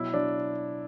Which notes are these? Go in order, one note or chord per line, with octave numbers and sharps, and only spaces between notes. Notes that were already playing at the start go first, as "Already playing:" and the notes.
Already playing: B2 F#3 E4
F#3 D4